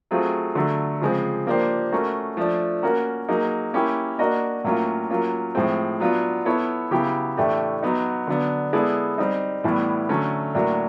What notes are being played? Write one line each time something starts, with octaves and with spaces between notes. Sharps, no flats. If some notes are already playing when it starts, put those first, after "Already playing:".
F#3 A3 C4 F4 G#4
D3 F#3 A3
C#3 F3 G#3 C4
F3 A#3 D4 G4 C5
A3 C#4 F#4 A#4
F3 A3 D4
A#3 C#4 F#4 A#4
F#3 A#3 D#4 G#4
A#3 C#4 E4 G4
A#3 D4 F#4 A#4 D#5
A2 F#3 A#3 C#4 F4
F#3 A#3 C#4 F4
A2 F3 G#3 C4
F#3 B3 D4 F4
B3 E4 A4 C#5
C#3 F#3 B3 E4 G4
A2 E3 A3 D4 G4
F#3 B3 D#4
D3 F#3 B3 D4
G#3 B3 E4 A4 D5
G3 C4 D#4
A2 E3 G3 B3
D3 F#3 A3 C#4
A2 F#3 A#3 D4